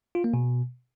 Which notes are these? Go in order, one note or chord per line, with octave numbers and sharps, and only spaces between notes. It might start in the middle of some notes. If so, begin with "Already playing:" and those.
F4
A#3
B2